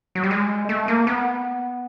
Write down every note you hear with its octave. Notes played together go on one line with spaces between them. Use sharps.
F#3
G3
G#3
A3
A#3
B3